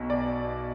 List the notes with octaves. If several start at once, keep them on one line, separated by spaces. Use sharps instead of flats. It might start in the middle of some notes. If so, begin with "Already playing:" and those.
Already playing: B1 B2
D5